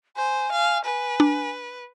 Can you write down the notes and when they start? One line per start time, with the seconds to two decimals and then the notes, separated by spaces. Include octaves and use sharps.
0.17 C5 G#5
0.52 F5
0.85 B4 G#5
1.20 D4